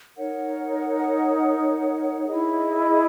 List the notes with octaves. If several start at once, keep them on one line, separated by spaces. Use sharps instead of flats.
D#4 A#4 C#5 F#5
E4 G#4 D#5